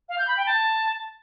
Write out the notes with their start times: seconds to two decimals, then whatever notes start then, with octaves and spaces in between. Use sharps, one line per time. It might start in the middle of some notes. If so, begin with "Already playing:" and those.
0.09 F5
0.18 G6
0.27 B5
0.37 G5
0.46 A5